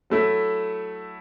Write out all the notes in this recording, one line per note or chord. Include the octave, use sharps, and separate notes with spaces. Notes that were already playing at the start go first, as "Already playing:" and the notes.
F#3 A3 E4